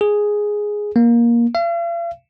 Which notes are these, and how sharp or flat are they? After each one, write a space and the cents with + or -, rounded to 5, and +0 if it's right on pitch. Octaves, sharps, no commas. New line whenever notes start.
G#4 +0
A#3 +15
F5 -45